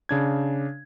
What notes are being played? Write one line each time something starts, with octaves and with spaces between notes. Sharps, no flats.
C#3 D4 G#6